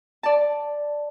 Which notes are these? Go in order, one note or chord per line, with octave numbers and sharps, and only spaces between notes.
D5 A5